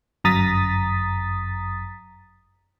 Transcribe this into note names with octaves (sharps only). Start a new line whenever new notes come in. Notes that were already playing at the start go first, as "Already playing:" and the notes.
G1 F#2 A#5 D#6 A6 B6